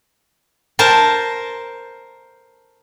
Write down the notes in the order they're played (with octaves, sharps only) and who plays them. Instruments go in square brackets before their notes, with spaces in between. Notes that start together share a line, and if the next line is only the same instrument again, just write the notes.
[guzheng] A#4 C5 A5 A#5